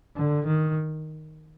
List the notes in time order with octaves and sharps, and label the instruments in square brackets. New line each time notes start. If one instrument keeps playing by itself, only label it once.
[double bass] D3
D#3